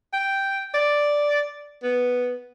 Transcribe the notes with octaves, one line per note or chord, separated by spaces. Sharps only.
G5
D5
B3